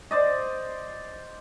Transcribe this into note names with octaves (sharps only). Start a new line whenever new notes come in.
C5 D5 D#5